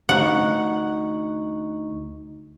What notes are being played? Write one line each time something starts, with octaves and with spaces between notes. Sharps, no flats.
D2 D#4 F#5 C#6